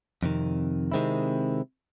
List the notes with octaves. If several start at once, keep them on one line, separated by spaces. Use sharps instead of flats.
F2 C3 D#3
C3 D#3 G#3 C4 E4